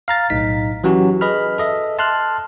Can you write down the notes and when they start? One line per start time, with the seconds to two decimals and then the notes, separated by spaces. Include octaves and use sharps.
0.08 F5 A#5 A6
0.30 B1 A2 D#4 B6
0.84 E3 F#3 C#4 F#4 G4
1.21 G#4 B4 D#5 B5 F6
1.58 A4 D#5 E5
1.99 A5 C6 F6 F#6